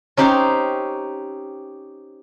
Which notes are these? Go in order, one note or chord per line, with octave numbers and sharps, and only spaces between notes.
C#4 D#4 G4 C5